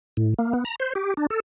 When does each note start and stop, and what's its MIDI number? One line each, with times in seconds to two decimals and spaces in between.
0.17 0.34 45
0.39 0.53 58
0.53 0.64 59
0.65 0.76 82
0.80 0.93 72
0.95 1.14 67
1.17 1.26 62
1.30 1.40 69